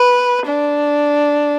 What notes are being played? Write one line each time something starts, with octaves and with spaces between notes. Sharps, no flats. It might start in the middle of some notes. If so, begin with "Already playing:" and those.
Already playing: B4
D4